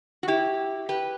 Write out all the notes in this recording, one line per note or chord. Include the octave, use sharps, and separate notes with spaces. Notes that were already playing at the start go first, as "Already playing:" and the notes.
F#4
E4 G4
G4 B4